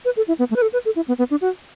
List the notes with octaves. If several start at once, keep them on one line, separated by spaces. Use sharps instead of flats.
B4
A4
E4
B3
A3
B4
A4
B4
A4
E4
B3
B3
D4
F#4